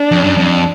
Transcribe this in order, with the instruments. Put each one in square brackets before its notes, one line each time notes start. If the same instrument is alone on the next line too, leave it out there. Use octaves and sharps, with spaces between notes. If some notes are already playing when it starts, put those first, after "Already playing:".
Already playing: [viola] D4
[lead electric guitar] F2
F#2
F2